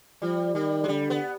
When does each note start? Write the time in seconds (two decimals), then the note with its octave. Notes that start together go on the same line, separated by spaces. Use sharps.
0.22 F3 G3
0.55 D#3 G3
0.84 G#3
0.88 D3 G3
1.10 B3